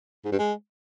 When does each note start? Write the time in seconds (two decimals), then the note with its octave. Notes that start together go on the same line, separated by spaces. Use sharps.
0.25 G#2
0.32 G2
0.39 G#3